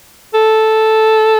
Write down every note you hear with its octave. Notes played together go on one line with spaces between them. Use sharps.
A4